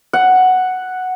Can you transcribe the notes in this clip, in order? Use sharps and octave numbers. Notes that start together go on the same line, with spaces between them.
F#5